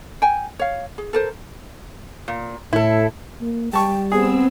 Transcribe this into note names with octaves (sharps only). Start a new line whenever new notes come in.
G5 G#5
C#5 F5
G#4
A4 A#4 C5
A#2
A2 E4 A4
A#3
G3 G5 A5 C#6
B3 C4 G#4 E6